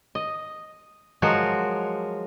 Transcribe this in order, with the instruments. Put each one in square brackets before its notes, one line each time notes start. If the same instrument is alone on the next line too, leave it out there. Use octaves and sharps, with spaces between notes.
[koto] D#5
F3 F#3 G#3 F4 F#4 A#4